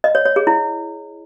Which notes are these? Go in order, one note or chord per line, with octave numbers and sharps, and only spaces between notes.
D#5
C#5
C#5
G#4
E4